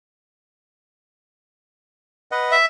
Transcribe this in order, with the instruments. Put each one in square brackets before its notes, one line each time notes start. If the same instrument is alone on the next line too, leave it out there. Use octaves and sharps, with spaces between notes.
[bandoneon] B4 D#5 F#5
[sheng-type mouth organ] E5